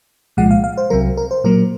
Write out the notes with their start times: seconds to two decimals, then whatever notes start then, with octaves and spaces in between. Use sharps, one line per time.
0.37 C2 A#2 F3 G#3 F#5
0.51 F5
0.64 F5
0.77 C5
0.90 C2 C3 F#3 A#4
1.17 A#4
1.31 C5
1.44 A#2 F#3 A#3 A#4